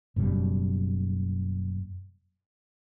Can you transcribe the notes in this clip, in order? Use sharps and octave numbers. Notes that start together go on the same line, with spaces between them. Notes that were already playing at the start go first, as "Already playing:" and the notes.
F#1 F#2 B2 G3